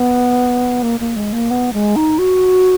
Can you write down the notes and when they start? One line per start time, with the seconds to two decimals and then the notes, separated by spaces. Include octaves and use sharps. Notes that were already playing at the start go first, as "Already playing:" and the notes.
Already playing: B3
0.83 A#3
1.00 A#3
1.16 G#3
1.33 A#3
1.51 B3
1.73 G#3
1.96 D#4
2.19 F#4